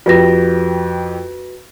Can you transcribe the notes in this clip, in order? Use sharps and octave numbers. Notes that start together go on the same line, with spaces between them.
F2 F#4 G4 B4 A#6